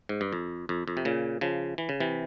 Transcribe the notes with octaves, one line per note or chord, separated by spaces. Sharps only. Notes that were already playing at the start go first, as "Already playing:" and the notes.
G#2
G2
F2
F2
F2
C3
A#2 C#3
C#3 F3
E3
C#3
C3 E3